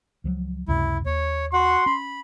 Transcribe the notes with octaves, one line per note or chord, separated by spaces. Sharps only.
C#2 F3 F#3
C#2 F#2 C3 E4
D#2 C#5
F#4 F#5 C6
C#4 B5